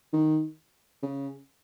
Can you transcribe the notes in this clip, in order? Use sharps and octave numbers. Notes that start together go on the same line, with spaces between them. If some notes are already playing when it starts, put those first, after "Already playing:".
D#3
C#3